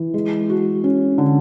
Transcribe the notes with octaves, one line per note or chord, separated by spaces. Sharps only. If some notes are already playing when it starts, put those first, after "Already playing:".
Already playing: E3
G#3
F#4
C#4
D3